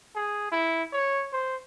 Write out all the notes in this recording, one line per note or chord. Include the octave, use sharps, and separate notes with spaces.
G#4
E4
C#5
C5